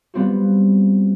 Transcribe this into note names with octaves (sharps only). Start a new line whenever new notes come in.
G3 B3 C4 F4 F#4